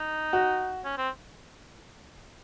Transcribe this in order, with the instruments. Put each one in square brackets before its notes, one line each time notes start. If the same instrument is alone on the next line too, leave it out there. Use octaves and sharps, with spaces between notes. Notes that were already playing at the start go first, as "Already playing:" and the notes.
Already playing: [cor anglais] D#4
[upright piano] F#4
[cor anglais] C#4
C4